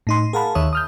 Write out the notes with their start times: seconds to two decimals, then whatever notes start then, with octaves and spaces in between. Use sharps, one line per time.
0.07 A2 D#4 C6
0.33 G#4 A#4 F5 F#5 A5 B5
0.55 D#2 D#3 C#5 E5 D#6
0.73 D#6 F6 G6